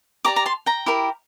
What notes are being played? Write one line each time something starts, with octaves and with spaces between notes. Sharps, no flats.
G4 D5 A#5 D6
A#5
A5 C6
G5 A#5
E4 G4 A#4